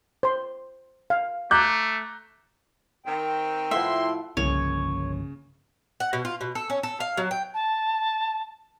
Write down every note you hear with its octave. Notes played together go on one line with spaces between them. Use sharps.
C5 C6
F5
A3 A#5 D6 F#6 G6
D#3 C4 G5
A2 F3 E4 E5 F#5 C6
G1 C2 C#3 F3 A#3 C#5
F#5
B2
F4
B2
A4
C#4
A4
F5
F#3
G5
A5